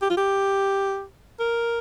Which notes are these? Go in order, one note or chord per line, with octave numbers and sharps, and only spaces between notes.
G4
F4
G4
A#4